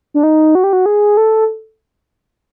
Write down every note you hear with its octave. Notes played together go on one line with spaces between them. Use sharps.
D4
D#4
F#4
G4
F#4
G#4
A4